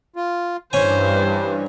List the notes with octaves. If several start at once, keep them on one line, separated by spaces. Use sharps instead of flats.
F4
G2 E3 C#4 C5 G#5